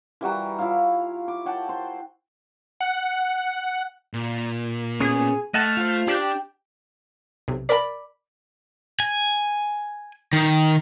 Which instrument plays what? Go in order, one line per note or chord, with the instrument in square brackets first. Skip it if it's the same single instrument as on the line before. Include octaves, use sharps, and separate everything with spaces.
[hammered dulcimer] E3 G3 F#4 A#5
E4 F4 C#5 F5
D6
C#5 F#5 G5 A5
C5
[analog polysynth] F#5
[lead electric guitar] A#2
[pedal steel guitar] B3 C#4 [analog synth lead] G#4
[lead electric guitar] A3 [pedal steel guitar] D#5 F#5 A5 [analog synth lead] F6
[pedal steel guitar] F4 C5
[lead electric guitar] D4 [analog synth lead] G4
[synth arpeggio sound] B1 C3
[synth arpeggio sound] A#4 B6 [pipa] D5 B5
[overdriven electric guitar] G#5
D#3